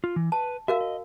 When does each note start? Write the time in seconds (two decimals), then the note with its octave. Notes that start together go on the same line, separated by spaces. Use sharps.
0.04 F4
0.16 E3
0.32 B4 A5
0.68 F#4 A#4 E5 F5
0.81 D#5